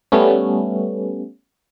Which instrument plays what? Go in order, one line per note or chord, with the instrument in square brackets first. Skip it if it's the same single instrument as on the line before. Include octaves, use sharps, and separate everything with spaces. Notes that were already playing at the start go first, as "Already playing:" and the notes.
[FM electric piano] G3 A3 B3 C#4